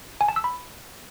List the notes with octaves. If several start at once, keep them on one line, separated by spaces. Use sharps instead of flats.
G#5
A5
E6
B5